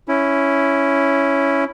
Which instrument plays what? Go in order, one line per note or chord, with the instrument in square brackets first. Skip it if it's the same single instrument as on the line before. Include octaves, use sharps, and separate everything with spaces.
[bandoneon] C#4 E4